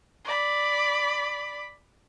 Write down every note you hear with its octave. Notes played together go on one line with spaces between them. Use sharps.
D5 B5